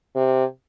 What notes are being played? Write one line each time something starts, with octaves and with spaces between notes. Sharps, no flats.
C3